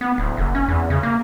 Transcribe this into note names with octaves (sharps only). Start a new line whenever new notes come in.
B3
D1
F#1
C#4
E2
C#3
A#3